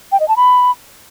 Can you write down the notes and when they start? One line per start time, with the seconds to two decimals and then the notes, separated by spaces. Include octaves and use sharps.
0.12 G5
0.20 D#5
0.28 A5
0.36 B5